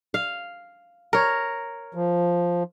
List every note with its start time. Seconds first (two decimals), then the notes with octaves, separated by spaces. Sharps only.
0.14 F5
1.13 A#4 C#5
1.95 F3